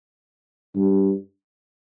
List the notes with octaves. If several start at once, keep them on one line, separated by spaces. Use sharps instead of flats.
G2